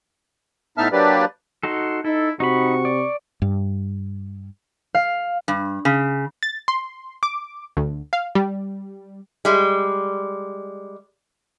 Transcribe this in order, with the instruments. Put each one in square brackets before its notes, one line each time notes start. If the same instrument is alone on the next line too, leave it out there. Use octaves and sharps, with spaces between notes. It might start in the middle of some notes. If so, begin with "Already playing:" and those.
[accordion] A2 B3 D#4 E5 A5 F6
F#3 A#3 D4 G4 B4 D5
[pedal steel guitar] D#4 F#4 A4 [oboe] C6
[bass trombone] D#4 [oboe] E4 [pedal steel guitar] A4
[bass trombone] C3 [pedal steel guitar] D#4 B5 [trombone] F#4 [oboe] C#6
[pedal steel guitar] D5
[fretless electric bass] G2
[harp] F5
[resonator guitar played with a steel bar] G2
C#3
[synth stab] A6
C6
D6
D2
F5
G3
[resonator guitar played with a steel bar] G3 G#3